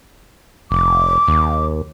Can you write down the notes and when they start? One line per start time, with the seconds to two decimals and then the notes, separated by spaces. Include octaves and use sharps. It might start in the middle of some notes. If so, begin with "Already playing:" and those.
0.71 F1 D6
1.28 D#2